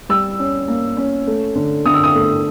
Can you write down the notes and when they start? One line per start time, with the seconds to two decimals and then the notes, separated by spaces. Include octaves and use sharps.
0.09 G3 E6
0.39 C#4
0.68 A#3
0.97 C#4
1.27 A3
1.55 D3
1.86 D3 D#6
1.94 E6
2.04 D#6
2.15 A3